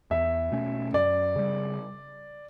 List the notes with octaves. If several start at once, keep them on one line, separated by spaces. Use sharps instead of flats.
E2 E5
B2 A3 C#4
F#2 D5
C#3 G3